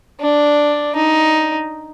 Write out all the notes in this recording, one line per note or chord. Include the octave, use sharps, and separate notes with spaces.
D4
D#4